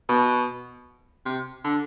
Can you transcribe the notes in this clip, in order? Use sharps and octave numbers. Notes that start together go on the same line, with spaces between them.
B2
C3
D3